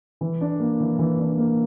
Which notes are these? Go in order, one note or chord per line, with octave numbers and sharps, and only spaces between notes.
E3
D4
A#3
E3
E3
D4
A#3